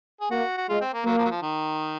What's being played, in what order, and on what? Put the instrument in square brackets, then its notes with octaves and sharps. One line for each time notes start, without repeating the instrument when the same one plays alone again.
[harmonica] G#4
[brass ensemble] A#3 [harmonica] F#4
[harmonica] F#4
[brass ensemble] G#3 [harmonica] F4
[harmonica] C4
A#3
[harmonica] F#3 [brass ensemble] A#3
[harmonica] F3
F#3
F3
D#3